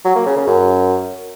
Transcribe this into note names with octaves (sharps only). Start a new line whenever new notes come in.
F#3
A#3
C#3
C#3
F#2